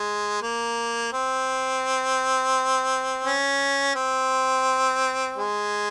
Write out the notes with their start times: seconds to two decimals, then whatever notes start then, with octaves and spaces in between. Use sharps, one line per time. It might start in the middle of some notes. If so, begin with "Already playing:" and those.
Already playing: G#3
0.42 A#3
1.13 C4
3.25 C#4
3.95 C4
5.38 G#3